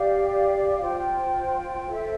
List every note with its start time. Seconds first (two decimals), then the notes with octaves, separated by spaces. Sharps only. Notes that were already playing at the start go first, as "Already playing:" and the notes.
Already playing: G4 D5 F5
0.81 F4 C5 G5
1.89 A4 C5 E5